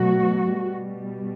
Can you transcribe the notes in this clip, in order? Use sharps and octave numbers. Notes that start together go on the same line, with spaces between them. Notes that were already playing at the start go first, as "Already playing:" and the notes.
Already playing: B2 F#3 A3 F#4
B2 G3